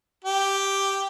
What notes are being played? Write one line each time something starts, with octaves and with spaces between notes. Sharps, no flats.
G4